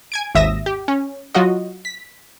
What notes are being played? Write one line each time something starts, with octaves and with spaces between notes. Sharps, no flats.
G#5 G#6 D7
G#1 D#2 E5 D#6 A#6 E7
G4
C#4
F#3 F4 F#4 D#5
B6